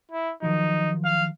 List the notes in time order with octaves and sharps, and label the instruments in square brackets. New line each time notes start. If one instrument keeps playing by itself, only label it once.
[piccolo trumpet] E4
[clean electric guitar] D#3 F3 F#3 [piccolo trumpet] D#4
[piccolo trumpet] F5